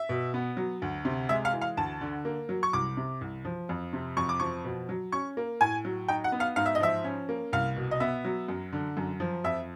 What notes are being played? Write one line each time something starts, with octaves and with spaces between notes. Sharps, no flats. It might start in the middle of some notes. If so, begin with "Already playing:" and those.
Already playing: E5
B2
B3
F#3
D2
C3
G#3 E5
F5
E3
F5
D2 A5
D3
A#3
F#3
C#6
C2 D6
C3
C2
F3
F2
C3
F2 C#6
D6
F3 C#6
B2
F#3
C#4 C#6
A#3
A2 G#5
F#3
D#4 G5
F#5
B3
F5
G#2 F5
E5
D#5
F3 E5
C#4
A#3
C2 F5
B2
D#5
B3 E5
F#3
F#2
D3
F#2
F3
F2 E5